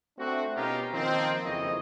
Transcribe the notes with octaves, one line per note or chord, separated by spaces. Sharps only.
A3 C4 D4 F#4
B2 C#4 D#4 F4 G4 A#4
D#3 F3 A#3 C4
F#1 F2 E3 C#5 D#5